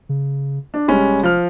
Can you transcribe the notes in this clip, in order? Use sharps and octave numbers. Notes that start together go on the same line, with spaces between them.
C#3
D4
F1 G3 G#3 C#4
F3 F6